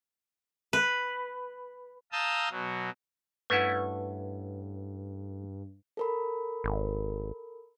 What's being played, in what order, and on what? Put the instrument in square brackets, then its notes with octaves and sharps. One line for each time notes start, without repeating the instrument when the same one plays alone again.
[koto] B4
[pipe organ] F5 A5 A#5 D#6 E6 G6
B2 F#3
[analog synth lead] G2 [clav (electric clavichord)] A3 C#4 E4 [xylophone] B4 F#5
[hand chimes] A4 A#4 B5
[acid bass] G#1